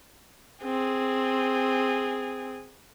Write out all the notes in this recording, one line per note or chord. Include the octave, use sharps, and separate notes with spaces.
C4 G#4